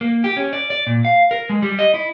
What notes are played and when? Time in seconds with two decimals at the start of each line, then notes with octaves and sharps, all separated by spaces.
0.01 A#3
0.24 G4
0.37 C#4
0.53 D5
0.70 D5
0.87 A#2
1.05 F5
1.31 A#4
1.50 G#3
1.62 G3
1.79 D#5
1.94 E4